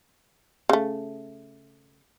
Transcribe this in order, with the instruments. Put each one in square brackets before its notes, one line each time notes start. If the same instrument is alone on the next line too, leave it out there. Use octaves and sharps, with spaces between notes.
[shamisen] C#3 A3